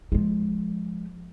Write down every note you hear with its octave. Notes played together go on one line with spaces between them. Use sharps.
F3 G#3